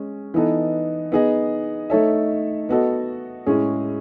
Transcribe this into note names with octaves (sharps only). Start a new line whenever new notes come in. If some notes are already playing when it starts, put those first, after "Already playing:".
Already playing: G#3 C#4
E3 B3 D#4 A4
B3 D#4 G#4 D#5
A3 D#4 A4 C#5 E5
B3 F#4 A4 D#5
A2 G#3 C#4 G#4